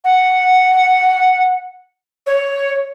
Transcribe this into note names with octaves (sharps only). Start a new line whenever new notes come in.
F#5
C#5